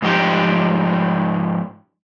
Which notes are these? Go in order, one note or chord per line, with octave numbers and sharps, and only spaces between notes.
G#2 F3 D#4 G4 G5